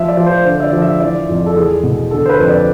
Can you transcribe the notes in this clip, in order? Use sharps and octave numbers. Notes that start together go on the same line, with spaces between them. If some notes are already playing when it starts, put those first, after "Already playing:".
Already playing: F3 E5
D5
F3
C5
D3 C5
E5
D5
F3
E5
E3 D5
F2
A4
E2 G#4
B2
D3 A4
C5
B4
F2
D5